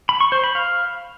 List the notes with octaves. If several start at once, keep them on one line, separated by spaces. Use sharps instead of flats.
B5
C#6
C5
B5
F5